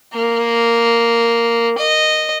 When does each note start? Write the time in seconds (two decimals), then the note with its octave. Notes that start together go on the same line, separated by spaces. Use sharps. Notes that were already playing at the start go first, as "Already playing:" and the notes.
0.13 A#3
1.78 D#5